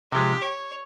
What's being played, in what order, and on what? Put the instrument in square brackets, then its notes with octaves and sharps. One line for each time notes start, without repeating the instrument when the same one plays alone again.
[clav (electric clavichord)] C3 F3 G#3 [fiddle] G4
[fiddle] C#5